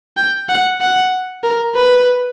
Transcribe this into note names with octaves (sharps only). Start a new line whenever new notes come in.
G5
F#5
F#5
A#4
B4